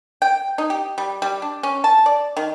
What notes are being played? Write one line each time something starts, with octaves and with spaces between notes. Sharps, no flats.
G5
D#4
G4
G3
G3
D4
C#4
A5
D5
D#3